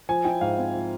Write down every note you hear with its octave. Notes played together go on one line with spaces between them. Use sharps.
F3 G#5
E4 G5
G#2 F5
C4
F3